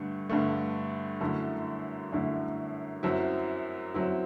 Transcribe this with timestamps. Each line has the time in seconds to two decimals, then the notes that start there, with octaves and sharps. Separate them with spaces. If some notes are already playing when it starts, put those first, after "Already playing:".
Already playing: G2 D3 A3
0.29 G2 D3 A3
1.21 F#2 D3 A3 E4
2.12 F#2 D3 A3 E4
3.03 F#2 F#3 C4 E4
3.94 F#2 F#3 C4 E4